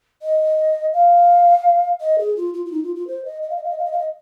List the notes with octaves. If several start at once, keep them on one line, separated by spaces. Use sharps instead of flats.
D#5
F5
D#5
G#4
F4
F4
F4
D#4
F4
F4
C5
D#5
D#5
F5
D#5
F5
D#5
F5
D#5
F5
D#5